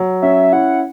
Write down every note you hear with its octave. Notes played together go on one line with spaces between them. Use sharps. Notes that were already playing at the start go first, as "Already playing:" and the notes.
Already playing: F#3
C#4 E5
E4 F#5